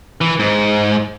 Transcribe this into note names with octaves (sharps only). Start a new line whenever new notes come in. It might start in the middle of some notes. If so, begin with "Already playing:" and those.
E3
G#2